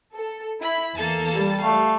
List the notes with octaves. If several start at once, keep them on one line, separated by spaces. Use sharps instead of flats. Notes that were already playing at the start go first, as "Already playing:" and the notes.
A4
E4 B5
E2 A#3 A4 A5
G3
A3 F5